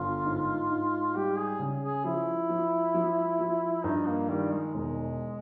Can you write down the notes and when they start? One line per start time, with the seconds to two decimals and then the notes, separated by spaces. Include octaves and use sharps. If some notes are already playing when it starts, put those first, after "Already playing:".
Already playing: G1 F4
0.25 G#2
0.70 G#2
1.15 G3 G4
1.38 G#4
1.59 C#3
1.83 G#4
2.04 F3 E4
2.49 F3
2.94 F3
3.39 F3
3.84 G2 D#4
4.06 A#3
4.29 D#3 G3
4.52 G#3
4.74 E1 G#3